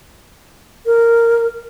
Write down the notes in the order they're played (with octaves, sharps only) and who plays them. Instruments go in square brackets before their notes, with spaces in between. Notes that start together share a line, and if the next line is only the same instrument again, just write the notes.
[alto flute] A#4